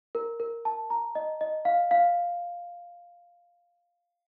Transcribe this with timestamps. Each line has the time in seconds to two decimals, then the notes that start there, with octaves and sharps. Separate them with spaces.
0.15 A#4
0.40 A#4
0.65 A5
0.90 A#5
1.15 D#5
1.41 D#5
1.65 F5
1.91 F5